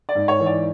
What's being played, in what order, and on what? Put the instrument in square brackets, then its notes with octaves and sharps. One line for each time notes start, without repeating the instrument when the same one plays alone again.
[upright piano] D5
G#2
C#5
E3
D5